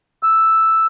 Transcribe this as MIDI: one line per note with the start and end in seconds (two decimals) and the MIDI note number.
0.23 0.86 88